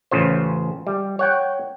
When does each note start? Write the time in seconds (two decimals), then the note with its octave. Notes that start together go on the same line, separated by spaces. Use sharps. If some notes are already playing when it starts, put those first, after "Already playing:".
0.11 A1 C#3 F4 C5
0.87 G3
1.19 C#5 F#5 G5